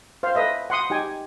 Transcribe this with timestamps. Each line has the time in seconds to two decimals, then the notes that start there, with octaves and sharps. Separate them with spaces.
0.23 C5 F5
0.35 A4 B4 D#5 E5
0.70 F#5 C6 D#6
0.90 D#4 G4 G5 G#5